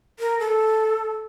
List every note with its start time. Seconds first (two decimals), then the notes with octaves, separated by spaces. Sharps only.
0.19 A#4
0.40 A4